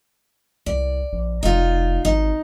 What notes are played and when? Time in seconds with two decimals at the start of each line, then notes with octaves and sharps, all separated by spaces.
0.66 C2 D5
1.12 A#1
1.43 F1 D#4 F4
2.05 G#1 D#4